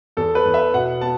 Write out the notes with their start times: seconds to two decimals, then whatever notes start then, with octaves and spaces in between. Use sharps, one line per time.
0.17 E2 A4
0.35 B4
0.45 E2
0.54 E5
0.74 B2 F#5
1.01 B3 A5